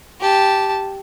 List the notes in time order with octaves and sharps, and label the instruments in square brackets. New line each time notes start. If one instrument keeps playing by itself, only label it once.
[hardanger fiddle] G4 A5